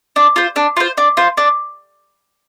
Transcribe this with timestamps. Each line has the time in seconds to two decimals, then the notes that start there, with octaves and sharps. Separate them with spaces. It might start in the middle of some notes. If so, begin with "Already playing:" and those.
0.16 D4
0.36 F4 C5
0.56 D4
0.77 F4 C5
0.97 D4
1.17 F4 C5
1.37 D4